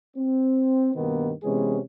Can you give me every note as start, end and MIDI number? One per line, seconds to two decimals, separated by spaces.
0.17 0.91 60
0.95 1.32 43
0.95 1.32 47
0.95 1.32 51
0.95 1.32 58
0.95 1.32 59
0.95 1.32 63
1.43 1.79 48
1.43 1.79 52
1.43 1.79 56
1.43 1.79 59
1.43 1.79 61
1.43 1.79 68